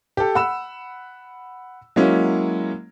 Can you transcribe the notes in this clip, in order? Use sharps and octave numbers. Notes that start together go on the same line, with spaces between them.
G4 A4
F#5 B5 E6 E7
F#3 G#3 A#3 C#4 E4